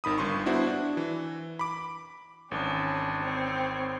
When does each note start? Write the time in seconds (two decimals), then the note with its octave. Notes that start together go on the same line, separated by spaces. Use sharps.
0.04 G#1 D#3 B5 D#6
0.18 G1 G2 C6 C#6
0.46 B3 D4 E4 F#4 C5
0.67 D4
0.97 E3
1.59 B5 D6
2.51 G#1 E3 C#4 D4
3.23 C4 C#5